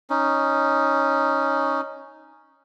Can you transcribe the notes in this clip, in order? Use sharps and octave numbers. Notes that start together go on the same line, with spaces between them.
C#4 D#4